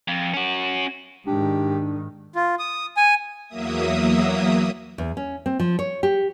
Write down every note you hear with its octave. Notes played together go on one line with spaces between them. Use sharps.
F2
C#4 F#4
G#2 D#3 D4 G4
F4
D#6
G#5
E2 F#3 A#3 E5 D#6
E2
C#4
C4
F3
C#5
G4